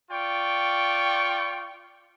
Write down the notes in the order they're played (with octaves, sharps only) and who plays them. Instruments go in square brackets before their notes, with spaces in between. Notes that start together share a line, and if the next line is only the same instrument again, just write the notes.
[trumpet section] F4 D5 G5 C#6